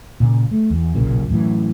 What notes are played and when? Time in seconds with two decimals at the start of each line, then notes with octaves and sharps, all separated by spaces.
0.20 A#2 C#3
0.51 A3
0.70 E2
0.95 F#1 B1 A#2 C#3
1.29 F#2 A2 E3